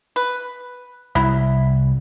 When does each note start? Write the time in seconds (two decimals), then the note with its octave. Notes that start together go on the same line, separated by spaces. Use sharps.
0.16 B4
1.15 C2 F#3 E4